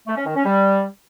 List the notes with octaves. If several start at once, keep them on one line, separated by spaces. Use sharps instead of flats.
A3
C#4
D#3
C#4
G3